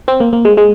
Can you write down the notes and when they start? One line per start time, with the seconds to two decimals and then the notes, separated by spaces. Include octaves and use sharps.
0.08 C4
0.20 A#3
0.33 A#3
0.45 G#3
0.57 G#3